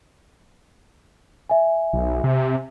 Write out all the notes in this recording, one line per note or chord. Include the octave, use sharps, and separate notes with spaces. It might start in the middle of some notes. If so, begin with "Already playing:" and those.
E5 G#5
B1
C3